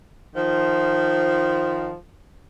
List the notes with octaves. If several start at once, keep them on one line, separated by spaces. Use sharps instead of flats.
D#3 F3